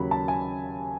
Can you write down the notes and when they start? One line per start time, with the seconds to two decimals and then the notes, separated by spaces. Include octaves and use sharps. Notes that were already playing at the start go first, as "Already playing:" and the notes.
Already playing: D#2 C#3 F#3 B5
0.11 A5
0.28 G#5